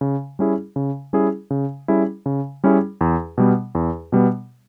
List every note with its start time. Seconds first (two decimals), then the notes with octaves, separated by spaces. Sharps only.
0.01 C#3
0.39 G3 C#4 E4 G#4
0.76 C#3
1.13 G3 C#4 E4 G#4
1.50 C#3
1.88 G3 C#4 E4 G#4
2.26 C#3
2.64 G3 C#4 E4 G#4
3.01 E2
3.38 B2 G3 B3
3.75 E2
4.12 B2 G3 B3